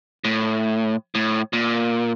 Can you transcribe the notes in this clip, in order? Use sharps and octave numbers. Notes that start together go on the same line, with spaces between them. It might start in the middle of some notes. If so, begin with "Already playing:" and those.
A2
A2
A#2